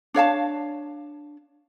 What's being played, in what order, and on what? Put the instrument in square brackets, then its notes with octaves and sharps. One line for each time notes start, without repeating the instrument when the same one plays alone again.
[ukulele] D4 C#5 F5 A5